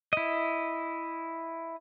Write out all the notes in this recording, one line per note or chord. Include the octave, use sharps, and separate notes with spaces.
E4 D#5